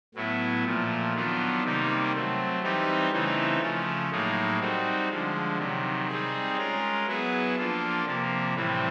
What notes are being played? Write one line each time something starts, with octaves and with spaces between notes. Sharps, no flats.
A2 F#3 B3 E4
A#2 F3 A3
D#3 F#3 B3 D4 F4
C3 D#3 G3 A#3 D#4
F#3 A3 C4
E3 G3 C4 D#4 G4
C#3 E3 A3 C4 D#4
C#3 F3 A3 C#4
A2 F#3 A#3 D#4 G#4
G3 C4 D#4 F#4
D3 F3 G#3
C3 D#3 F#3
G3 C4 D#4 G#4
G#3 C#4 F4 A#4
F#3 B3 E4 G#4 B4
F3 A#3 D4 F4 A4
C3 F3 A#3
A2 E3 G3 C4